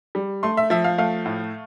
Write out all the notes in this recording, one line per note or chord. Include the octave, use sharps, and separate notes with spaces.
G3
A3 C6
E5
F3 E5
F5
A3 F5
A2